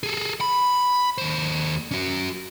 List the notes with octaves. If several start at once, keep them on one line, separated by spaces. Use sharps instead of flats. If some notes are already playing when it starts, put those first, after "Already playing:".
G#4 A4
B5
D#2 C5
C#4 F#4